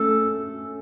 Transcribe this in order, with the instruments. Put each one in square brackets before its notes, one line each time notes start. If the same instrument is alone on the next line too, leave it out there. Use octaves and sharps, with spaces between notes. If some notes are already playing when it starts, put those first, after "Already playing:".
Already playing: [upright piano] A3 C#4 [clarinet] A4